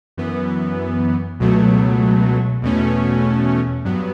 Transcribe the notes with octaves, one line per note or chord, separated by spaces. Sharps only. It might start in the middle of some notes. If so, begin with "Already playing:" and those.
F#2 E3 B3
C#2 B2 F#3 A3
E2 B2 A3 C#4
G2 F#3 B3